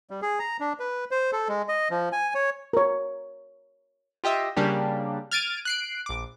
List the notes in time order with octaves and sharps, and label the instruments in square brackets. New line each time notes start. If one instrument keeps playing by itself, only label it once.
[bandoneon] G3
G#4
A#5
D4
B4
C5
A4
G#3
D#5
F3
G#5
C#5
[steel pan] A#4 C#5
[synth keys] F4 G4 D#5 E5
C#3 G3 A#3 D4 G4
F6 G#6 A6 D7 D#7
F#6 C7 D7
A#1 D6